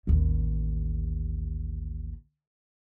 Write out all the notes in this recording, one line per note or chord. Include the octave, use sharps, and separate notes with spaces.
A1 D#2